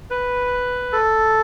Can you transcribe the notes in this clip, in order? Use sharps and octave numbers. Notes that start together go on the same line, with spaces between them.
B4
A4